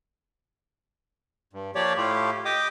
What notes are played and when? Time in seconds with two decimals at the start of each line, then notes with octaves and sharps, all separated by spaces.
1.53 G2
1.75 F3 A#3 G4 C#5 D5
1.97 A2 A3 E4 F4 G4
2.45 G4 D#5 G5 D6 D#6